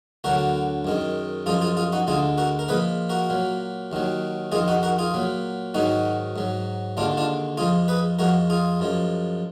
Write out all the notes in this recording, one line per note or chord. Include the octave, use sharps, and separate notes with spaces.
D2 D3 F#3 F#4 A#4
F#2 D#3 G#3
F#2 F3 G#3 F4 G#4
F4 G#4
F4 G#4
D#4 F#4
D2 D3 G#3 F4 G#4
F#4 A#4
A#4
A#2 F3 G#3 G#4 B4
F#4 A#4
A#2 F#3
D#2 D#3 F#3
F2 D#3 G#3 F4 G#4
D#4 F#4
F#4 A#4
F4 G#4
A#2 F#3
G#2 D#3 F#3 D#4 F#4
G#2 F#3
D#2 D3 G#3 D4 F4
D4 F4
F2 F3 G#3 F4 G#4
G#4 B4
F2 F3 G#3 F#4 A#4
F4 G#4
F#2 F3 G#3